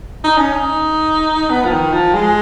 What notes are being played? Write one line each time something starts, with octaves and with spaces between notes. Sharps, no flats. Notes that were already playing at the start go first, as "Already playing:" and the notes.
D#4
C#4
D#4
B3
F3
D#3
F3
G#3